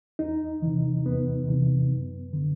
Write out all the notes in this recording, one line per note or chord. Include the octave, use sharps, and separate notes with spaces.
E2 D#4
C3 E3
E2 B3
C3 E3
F#2
D3